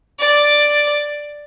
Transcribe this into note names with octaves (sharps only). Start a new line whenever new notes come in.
D5